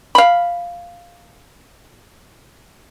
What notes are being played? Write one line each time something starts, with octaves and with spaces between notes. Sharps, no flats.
F5 B5